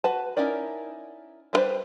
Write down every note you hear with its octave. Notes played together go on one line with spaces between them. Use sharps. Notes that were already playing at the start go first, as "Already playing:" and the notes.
F#4 B4 A5
C#4 D#4 E4 A#4 D5
G3 B3 D4 B4 C5